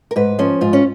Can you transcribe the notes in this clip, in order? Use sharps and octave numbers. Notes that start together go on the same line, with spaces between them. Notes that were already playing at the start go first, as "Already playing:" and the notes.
A#4
G#2 B4
F3 C#4
G#2 F4
C#4